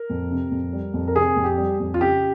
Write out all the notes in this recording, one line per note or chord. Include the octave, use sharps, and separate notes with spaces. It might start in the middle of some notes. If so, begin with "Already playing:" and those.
Already playing: A#4
F2
C3
F2
G3
F2
A#4
C3 G#4
F2
G4
G3
F2
F4
C#3 G4